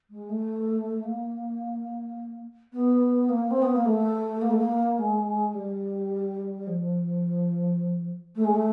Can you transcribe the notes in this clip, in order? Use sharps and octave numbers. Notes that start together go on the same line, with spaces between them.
G#3
A3
A#3
B3
A#3
C4
B3
A#3
A3
A#3
A3
A#3
G#3
G3
F3
A3
G#3
A3